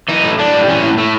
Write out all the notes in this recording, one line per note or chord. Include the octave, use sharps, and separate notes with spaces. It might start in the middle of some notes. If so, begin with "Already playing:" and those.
E3 D#4
A2
A2 D4
G3
E3 C#4
A2
A2 A3